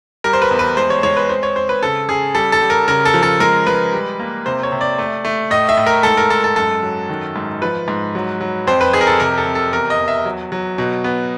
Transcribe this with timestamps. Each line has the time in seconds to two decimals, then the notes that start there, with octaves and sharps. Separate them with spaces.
0.24 G3 A#4
0.33 C5
0.42 B4
0.51 E2
0.59 B4
0.77 G#3 C5
0.90 C#5
1.03 G#3 C#5
1.17 B4
1.29 C4 C5
1.43 C#5
1.56 C4 C5
1.69 B4
1.82 C#3 A4
2.09 C#3 G#4
2.35 G3 A4
2.52 A4
2.62 G3
2.70 A#4
2.88 C#3 A#4
3.05 A4
3.14 F3
3.23 A4
3.40 G#3 A#4
3.67 G#3 B4
3.93 G3
4.19 A#3
4.46 C3 C5
4.63 C#5
4.72 C3
4.81 D5
4.98 A3
5.25 A3
5.51 A2 D#5
5.69 E5
5.77 A2
5.86 A#4
6.03 G#2 A4
6.17 A#4
6.30 G#2 A4
6.44 A4
6.56 F#2 A4
6.83 F#3
7.09 D#3
7.36 G#2
7.62 F3 B4
7.88 G#2
8.15 F#3
8.41 F#3
8.67 F2 C5
8.81 B4
8.93 F2 G#4
9.01 A#4
9.07 A4
9.20 C3 A#4
9.38 A4
9.46 C3
9.55 A4
9.72 E2 A#4
9.90 D#5
9.99 E2
10.08 E5
10.25 F#3
10.52 F#3
10.78 B2
11.04 B3